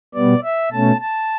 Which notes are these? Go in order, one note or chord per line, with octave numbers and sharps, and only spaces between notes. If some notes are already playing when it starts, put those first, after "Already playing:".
B2 G3 B3 D5
E5
B2 A3 C#4 A5
A5